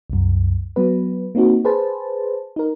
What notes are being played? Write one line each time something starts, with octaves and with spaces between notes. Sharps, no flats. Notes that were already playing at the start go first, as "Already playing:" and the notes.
C2 F#2
F#3 B3 B4
A#3 C4 D#4 F#4
G#4 B4 C5 A5
D#4 A#4